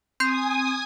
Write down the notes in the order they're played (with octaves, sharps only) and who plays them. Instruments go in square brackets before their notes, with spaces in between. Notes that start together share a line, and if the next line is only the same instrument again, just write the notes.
[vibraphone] C4 [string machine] G#5 D#6 [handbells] C6 G6 C7